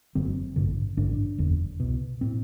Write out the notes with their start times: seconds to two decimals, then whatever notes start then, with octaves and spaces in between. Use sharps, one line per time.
0.15 F#1 F#2 D3 C4
0.56 A1 G2 D3
0.97 A1 G2 D3 D4
1.38 F#1 E2 D3
1.80 C2 B2
2.21 A2 C4